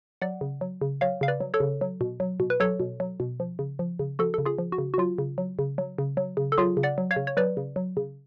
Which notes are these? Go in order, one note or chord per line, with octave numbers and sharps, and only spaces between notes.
F#3 D5 F#5
C#3
F#3
C#3
F#3 C#5 F5
C#3 F5
B4 D5
F#3
A4 C#5
C#3
F#3
B2
F#3
B2
B4
F#3 A4 C#5
B2
F#3
B2
F3
C#3
F3
C#3
F3 F#4 A4
C#3 A4
F4 G#4
F3
F#4
C#3
F#4
F#3 F4
C#3
F#3
C#3
F#3
C#3
F#3
C#3
A4
F#3 F4 G#4
C#3
D5 F#5
F#3
C#5 F5
C#3
C#5
F#3 B4 D5
C#3
F#3
C#3